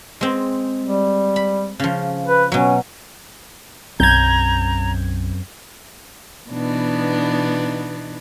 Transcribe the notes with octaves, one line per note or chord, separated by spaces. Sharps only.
G#3 C4
G3
B5
C#3 F3
B4
B2 F#3 C#4
B1 F#2 C4 A#5 G6 G#6
B2 E3 B3 D4 D#4